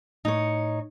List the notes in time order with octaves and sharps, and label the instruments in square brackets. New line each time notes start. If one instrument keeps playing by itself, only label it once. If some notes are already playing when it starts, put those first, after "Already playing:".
[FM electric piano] A2 [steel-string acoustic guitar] D#4 C#5